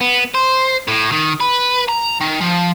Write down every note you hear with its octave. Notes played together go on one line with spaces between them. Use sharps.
B3
C5
A2
D#3
B4
A#5
D#3
F3